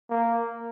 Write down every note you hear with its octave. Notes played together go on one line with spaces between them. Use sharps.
A#3